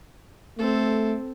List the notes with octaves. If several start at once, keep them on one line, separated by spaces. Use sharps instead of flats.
A3 C4 A4